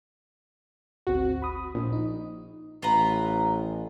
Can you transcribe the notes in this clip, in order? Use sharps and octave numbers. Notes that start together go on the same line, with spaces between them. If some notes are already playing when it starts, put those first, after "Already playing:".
G#1 D2 C4 F#4
B5 D#6
A#1
D#4
A1 F4 B4 A#5